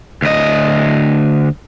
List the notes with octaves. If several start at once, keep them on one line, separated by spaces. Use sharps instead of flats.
D2 D#5